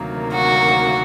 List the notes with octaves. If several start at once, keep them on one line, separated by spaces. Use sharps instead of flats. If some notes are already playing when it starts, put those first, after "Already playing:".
Already playing: D2 C3 D#3 F#3 A#3
F#4